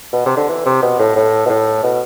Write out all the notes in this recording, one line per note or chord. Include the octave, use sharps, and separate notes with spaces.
B2
C3
D3
E3
C3
B2
A2
A2
B2
A2
B2